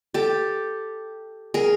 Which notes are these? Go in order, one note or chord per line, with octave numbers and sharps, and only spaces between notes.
G4 A4
G#4 A#4